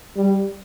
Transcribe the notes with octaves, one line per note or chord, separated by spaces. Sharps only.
G3